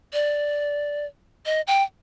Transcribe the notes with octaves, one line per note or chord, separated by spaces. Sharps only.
D5
D#5
G5